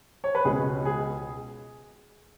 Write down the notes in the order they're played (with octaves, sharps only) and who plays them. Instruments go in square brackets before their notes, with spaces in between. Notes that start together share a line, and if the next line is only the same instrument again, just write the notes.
[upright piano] C#5
B4
C#2 B2 G#3 G#4
G#4